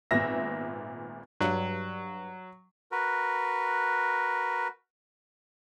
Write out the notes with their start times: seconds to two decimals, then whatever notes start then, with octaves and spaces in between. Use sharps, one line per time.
0.11 G#1 A#2 B3 E5 A#6
1.40 G2 F#3
2.92 F#4 A#4 B4